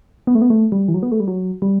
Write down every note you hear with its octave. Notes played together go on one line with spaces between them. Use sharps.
B3
A3
B3
A3
G3
E3
F#3
B3
A3
G3
F#3
G3